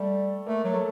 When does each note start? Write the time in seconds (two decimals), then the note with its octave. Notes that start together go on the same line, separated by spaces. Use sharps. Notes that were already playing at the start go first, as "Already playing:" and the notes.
Already playing: G3 A3
0.46 A3 A#3
0.64 F#3
0.74 A3